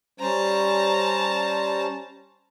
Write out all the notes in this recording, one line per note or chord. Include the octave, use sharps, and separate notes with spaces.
G3 C#4 C5 A5 A#5